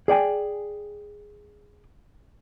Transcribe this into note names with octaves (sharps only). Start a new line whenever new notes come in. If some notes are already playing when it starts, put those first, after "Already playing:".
G#4 D5 G5 G#5